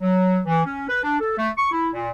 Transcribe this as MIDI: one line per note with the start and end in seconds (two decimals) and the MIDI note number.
0.01 0.41 54
0.46 0.64 52
0.65 0.85 61
0.88 1.00 71
1.04 1.20 62
1.20 1.36 69
1.38 1.50 57
1.57 1.68 85
1.72 1.89 64
1.93 2.11 46